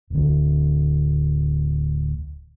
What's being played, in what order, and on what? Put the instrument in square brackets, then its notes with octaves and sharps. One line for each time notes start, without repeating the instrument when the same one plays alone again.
[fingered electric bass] D1 D2